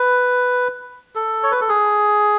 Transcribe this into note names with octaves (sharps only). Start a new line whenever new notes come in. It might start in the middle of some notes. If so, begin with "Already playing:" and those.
Already playing: B4
A4
C#5
B4
A4
G#4